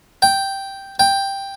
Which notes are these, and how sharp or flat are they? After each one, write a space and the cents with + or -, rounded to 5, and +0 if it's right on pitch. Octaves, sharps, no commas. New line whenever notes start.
G5 +0
G5 +10